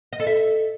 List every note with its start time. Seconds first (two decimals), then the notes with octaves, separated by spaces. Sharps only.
0.13 D#5
0.20 A4
0.27 E5